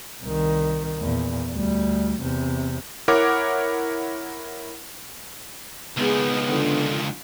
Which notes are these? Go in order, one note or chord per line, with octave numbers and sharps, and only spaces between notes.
C2 D#3
E2 A#2
D2 G3
E2 C3
E4 A#4 C#5 F#5 D6
C#2 D#3 G#3 B3 G#4
D3 D4 F4